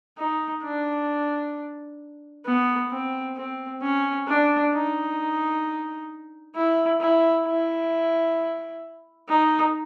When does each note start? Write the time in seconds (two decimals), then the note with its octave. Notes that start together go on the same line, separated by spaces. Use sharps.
0.18 D#4
0.64 D4
2.46 B3
2.91 C4
3.37 C4
3.82 C#4
4.28 D4
4.74 D#4
6.56 E4
7.01 E4
7.47 E4
9.29 D#4